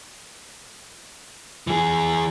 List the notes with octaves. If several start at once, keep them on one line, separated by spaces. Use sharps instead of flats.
E3 G#4